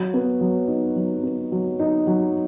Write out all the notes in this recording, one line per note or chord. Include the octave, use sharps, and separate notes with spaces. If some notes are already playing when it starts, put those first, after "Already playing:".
Already playing: F#3
B3
F#3
D#4
F#3
B3
F#3
D#4
F#3